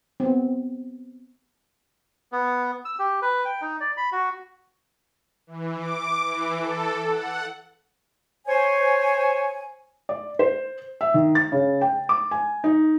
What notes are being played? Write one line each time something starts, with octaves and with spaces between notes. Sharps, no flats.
B3 C4
B3
E6
G4
B4
G5
D#4
D5
B5
F#4
E3
D6
E3
A4
F#5
C5 C#5 G#5
D5
C5
E5
D#3
A6
C#3
G5
D6
G#5
D#4